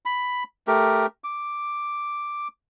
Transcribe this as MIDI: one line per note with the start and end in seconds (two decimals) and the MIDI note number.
0.05 0.44 83
0.67 1.06 57
0.67 1.06 67
0.67 1.06 70
1.24 2.48 86